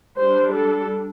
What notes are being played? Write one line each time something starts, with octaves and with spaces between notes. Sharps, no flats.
G3 D4 C5
A4